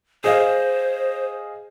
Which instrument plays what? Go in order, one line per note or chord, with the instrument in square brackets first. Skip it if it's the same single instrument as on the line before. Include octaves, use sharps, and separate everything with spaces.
[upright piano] G#4 D#5 F5 [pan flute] C5